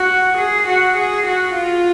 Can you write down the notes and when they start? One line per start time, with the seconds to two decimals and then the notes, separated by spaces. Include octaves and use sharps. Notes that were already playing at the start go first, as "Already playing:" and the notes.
Already playing: F#4
0.38 G#4
0.68 F#4
0.98 G#4
1.27 F#4
1.56 F4